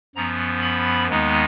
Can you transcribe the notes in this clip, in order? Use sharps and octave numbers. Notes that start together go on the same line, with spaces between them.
F#2 F3 B3 A#5
B5
D#2 D#3 G#3 B3 D#4